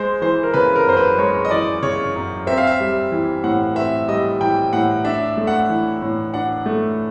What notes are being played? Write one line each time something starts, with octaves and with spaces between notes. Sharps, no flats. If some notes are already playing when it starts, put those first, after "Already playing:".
Already playing: G#3 C5
E3 C5
A#4
C#3 B4
A#4
F#2 C5
B4
G#3 C#5
D#5
E3 D5
C#3 C#5
F#2
C4 E5
F5
E5
G3
E3
A2 F#5
C4 E5
G3 D#5
E3 G5
A2 F#5
D4 E5
A3
F#5
E3
A2
D4 F#5
A3